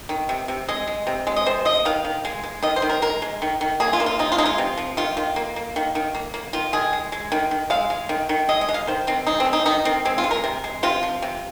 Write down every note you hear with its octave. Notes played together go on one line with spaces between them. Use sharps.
D#3
C3
C3
G#3 D#5
G#3
C3
G#3
D#5
C3 C5
F3 D#5
D#3 F5
D#3
G#3
G#3
D#3 D#5
C5
D#3
A#4
G#3 A#4
G#3
D#3
D#3
A#3 G#4
F4
A#3
F4
C3 D#4
F4
G#3 D#4
F4
C3
F3
D#3 F4
D#3
A#3
A#3
D#3
D#3
A#3
A#3
D#3 F4
D#3 G#4
G#3
G#3
D#3
D#3
G#3 F5
G#3
D#3
D#3
G#3 D#5
D#5
G#3
F5
D#3 C5
D#3 C4
G#3 D#4
C4
G#3
D#4
D#3 D#4
D#3 C4
G#3 C4
F4
G#3
A#4
C3
G#3
C3 F4
F3
C3